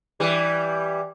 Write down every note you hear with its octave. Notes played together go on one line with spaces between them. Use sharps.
E3 G3